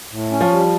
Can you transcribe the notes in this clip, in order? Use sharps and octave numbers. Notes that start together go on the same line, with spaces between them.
A2
C#4
F3
G3